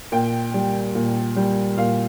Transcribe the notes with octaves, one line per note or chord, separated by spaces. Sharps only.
A#2 G5
G3
A#2
G3
A#2 F5